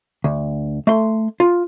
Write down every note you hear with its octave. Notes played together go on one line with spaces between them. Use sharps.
D2
A3 C6
F4